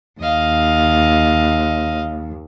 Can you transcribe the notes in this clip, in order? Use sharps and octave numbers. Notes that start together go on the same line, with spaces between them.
D#2 D#5 F5